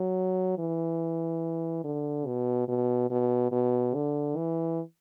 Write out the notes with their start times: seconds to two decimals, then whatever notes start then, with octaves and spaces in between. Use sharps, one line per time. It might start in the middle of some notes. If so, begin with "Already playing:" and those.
Already playing: F#3
0.58 E3
1.84 D3
2.27 B2
2.69 B2
3.11 B2
3.52 B2
3.94 D3
4.36 E3